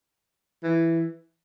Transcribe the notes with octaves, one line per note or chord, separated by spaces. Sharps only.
E3